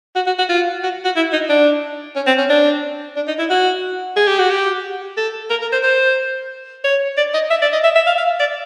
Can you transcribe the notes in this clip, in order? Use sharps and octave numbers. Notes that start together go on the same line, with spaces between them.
F#4
F#4
F#4
F4
F#4
F#4
E4
D#4
D4
C#4
C4
C#4
D4
D4
D#4
E4
F#4
G#4
G4
F#4
G4
A4
A#4
A#4
C5
C5
C#5
D5
D#5
E5
D5
D#5
E5
E5
F5
F5
D5